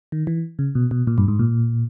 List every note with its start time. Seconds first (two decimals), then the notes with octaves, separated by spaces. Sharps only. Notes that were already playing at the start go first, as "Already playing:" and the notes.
0.12 D#3
0.27 E3
0.59 C#3
0.75 B2
0.91 B2
1.07 A#2
1.18 G2
1.28 G#2
1.39 A#2